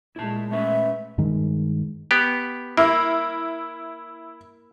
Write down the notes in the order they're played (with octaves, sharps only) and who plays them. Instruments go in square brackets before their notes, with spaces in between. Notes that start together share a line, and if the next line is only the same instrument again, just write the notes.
[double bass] A#2 G#3 [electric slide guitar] E4 A5
[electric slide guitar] A3 C#4 B4 [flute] E5
[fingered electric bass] G2 D#3 G#3
[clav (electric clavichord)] B3 G4
[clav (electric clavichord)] A#3 [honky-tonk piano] E4